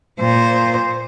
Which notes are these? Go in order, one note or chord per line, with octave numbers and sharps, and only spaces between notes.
A#2 C5